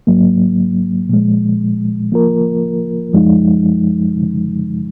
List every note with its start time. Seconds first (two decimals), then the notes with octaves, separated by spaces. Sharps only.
0.07 G#2 F#3 A#3
1.09 A#2 F3 G#3
2.12 F3 A#3 F4 A#4
3.13 F#2 F3 G#3 D#4